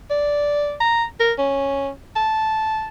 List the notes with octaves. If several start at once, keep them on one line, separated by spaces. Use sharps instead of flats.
D5
A#5
A#4
C#4
A5